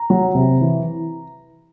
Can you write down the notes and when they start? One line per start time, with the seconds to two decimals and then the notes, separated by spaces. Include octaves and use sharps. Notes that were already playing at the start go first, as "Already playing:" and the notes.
Already playing: A#5
0.10 F#3
0.35 C3
0.61 E3